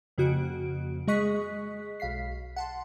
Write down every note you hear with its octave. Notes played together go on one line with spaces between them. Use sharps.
F2 C#3 A#3 F#4 F#6 D7
G#3 G#4 D#5 C#6 F#6 B6
B1 F5 B6 C7
F#5 A5 C6